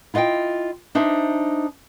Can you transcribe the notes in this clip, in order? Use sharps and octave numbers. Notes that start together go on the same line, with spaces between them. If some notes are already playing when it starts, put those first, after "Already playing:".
E4 F4 D#5 F#5 G5
D4 D#4 C5 E5